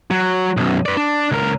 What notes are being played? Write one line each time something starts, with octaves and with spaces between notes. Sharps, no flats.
F#3
B1 F#2
B4 D5
D4
C#2 A#4